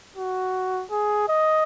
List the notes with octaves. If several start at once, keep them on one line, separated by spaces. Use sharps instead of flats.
F#4
G#4
D#5